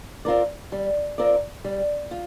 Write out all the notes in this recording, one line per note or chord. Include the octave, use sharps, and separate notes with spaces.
C4 F4 A#4 D5
G3
C4 F4 A#4 D5
G3
F4